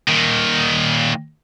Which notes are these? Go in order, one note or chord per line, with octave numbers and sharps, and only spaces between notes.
A#2 D#3